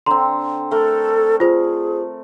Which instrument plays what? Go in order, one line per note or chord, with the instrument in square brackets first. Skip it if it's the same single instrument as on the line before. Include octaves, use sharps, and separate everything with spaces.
[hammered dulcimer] D3 C4 [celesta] A#5 C6
[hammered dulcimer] A3 A#4 [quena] A4
[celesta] F4 C5 [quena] G#4